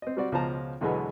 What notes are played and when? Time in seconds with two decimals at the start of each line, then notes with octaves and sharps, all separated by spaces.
0.02 C4 D#5
0.17 G3 C4 F#4 D5
0.32 C#2 B2 F3 C5 A5 A#5
0.81 E2 B2 D3 F#3 G#3 B3